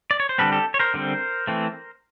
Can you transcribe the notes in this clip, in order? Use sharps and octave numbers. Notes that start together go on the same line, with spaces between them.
D5
C#5
C5
D3 G3 C4 A4 B4
G4 A4
C#5
A#4 C5
D3 G3 C4
E3 A3 C4